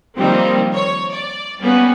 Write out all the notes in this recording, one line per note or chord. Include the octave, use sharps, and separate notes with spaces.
D#3 F3 G3 A#3 C4
C#5
D5
G3 A#3 B3 C#4